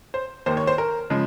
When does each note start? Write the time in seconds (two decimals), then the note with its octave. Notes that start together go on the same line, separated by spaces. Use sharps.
0.14 C5
0.46 D#2 D#3 A#3 C5
0.57 C#5
0.67 C5
0.78 A#4
1.10 C#3 F3 G#3